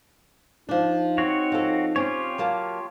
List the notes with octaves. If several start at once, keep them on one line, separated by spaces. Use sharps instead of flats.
F3 D4 D#4
C4 F#4 C#5
F3 A4
C4 C#4 F4 G4 C#5
F#3 A#3 A5